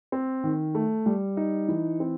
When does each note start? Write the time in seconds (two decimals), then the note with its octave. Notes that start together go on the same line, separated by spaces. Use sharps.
0.12 C4
0.44 D#3
0.75 A3
1.06 G3
1.37 D#4
1.69 E3
2.00 C4